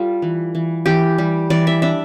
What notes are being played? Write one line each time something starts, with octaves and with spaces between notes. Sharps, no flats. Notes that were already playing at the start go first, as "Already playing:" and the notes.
Already playing: G3 F4 A4
E3
E3
E3 G4
G3
E3 D5
E5
D4 E5